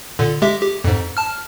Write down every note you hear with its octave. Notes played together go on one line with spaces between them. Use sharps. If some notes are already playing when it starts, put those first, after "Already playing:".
A#2 D3
G#3 G4 E5
G4
F2 G#2
A5 F6